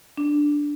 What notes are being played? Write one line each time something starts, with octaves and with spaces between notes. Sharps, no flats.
D4